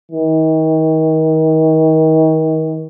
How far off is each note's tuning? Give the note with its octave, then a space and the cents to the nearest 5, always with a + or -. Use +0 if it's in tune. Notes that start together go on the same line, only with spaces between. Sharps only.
D#3 +35